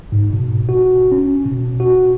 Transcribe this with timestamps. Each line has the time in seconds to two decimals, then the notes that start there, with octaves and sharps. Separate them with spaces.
0.12 G#2
0.33 B2
0.69 F#4
1.12 C#4
1.45 B2
1.80 F#4